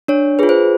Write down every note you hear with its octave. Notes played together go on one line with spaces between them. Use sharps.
D4 C#5
F4 G#4 B4
C5